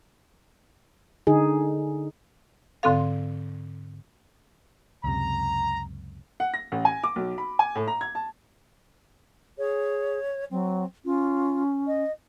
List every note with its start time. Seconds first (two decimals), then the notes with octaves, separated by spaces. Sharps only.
1.27 D3 D#4 G#4
2.83 G#2 D3 C4 A4 F5
5.04 C#2 F#2 C3 A#5
6.40 F#5
6.54 A#6
6.72 A1
6.85 G#5
7.04 D6
7.16 B1
7.38 B5
7.59 G#5
7.75 A2
7.87 A#5
8.01 G#6
8.15 A5
9.58 G#4 C#5
10.51 F#3 C4
11.05 C#4 F4
11.87 D#5